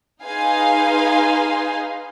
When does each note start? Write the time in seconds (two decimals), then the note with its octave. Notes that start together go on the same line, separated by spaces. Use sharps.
0.24 D#4 G#4 B4 F5 G#5 C6